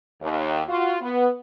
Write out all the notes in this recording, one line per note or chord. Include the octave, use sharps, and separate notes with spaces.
D#2
F4 F#4
B3